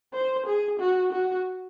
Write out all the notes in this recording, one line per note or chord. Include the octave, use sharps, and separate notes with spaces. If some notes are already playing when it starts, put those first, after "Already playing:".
C5
G#4
F#4
F#4